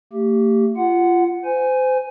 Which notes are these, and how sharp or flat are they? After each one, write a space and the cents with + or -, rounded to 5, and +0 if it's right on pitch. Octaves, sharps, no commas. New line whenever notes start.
A3 +45 G4 +0
F4 -20 F#5 +0
C5 -30 G#5 +0